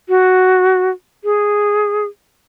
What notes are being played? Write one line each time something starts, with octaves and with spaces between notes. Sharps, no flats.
F#4
G#4